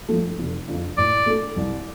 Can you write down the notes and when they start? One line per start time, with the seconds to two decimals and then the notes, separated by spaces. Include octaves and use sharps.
0.09 G2 F3 A3
0.39 F1
0.67 F2 D3 F3 D4
0.98 A2 D5
1.26 A3 D4 A4
1.56 C2